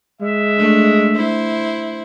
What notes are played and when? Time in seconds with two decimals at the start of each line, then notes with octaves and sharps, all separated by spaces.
0.21 G#3 E5
0.58 A3 D4
1.16 E4 C5